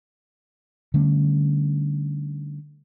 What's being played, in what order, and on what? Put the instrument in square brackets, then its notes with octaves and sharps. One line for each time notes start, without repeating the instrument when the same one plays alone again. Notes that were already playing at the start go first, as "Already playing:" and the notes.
[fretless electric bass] D3 G3 A3 C#4